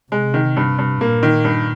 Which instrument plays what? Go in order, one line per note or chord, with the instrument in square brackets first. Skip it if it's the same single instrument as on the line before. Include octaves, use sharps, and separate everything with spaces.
[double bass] C3 [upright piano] G#3
[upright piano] D#3
G2
G2
[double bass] A#2 [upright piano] A#3
[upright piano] D#3
G2